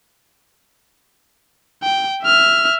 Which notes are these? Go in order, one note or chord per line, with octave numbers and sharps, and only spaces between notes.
G5
E5 F6